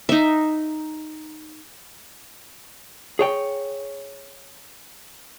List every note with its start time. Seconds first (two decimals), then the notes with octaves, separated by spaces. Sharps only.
0.09 D#4 E5
3.19 G#4 C#5 G5